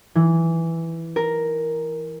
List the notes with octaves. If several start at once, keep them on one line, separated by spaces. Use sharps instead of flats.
E3
A#4